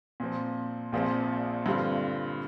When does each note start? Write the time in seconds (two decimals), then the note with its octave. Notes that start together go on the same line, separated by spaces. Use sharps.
0.20 A#2 F3 C4
0.92 A#1 A#2 F3 C4
1.66 G2 D3 G3 C4 F4